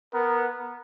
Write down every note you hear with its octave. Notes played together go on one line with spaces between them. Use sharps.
B3 A#4